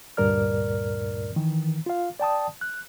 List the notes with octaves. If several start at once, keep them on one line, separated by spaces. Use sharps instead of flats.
D2 G2 A#2 A#4 D5 F6
D#3 E3
F4 F5
D5 G5 A5 D#6
F#6